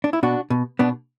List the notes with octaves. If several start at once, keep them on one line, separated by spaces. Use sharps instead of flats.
D4
E4
B2 D4 F#4
B2
B2 B3 D4